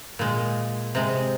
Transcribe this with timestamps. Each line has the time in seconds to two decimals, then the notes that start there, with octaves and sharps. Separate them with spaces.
0.19 A#2 G#3
0.95 C3 G#3